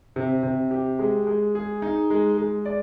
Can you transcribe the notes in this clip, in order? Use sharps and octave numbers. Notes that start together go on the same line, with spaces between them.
C3
C3
G4
G#3
G#3
G#4
D#4
G#3
G#3
D5